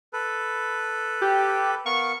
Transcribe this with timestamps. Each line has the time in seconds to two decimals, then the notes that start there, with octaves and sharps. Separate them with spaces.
0.13 A4 B4
1.21 G4
1.86 B3 A#4 F5 C#6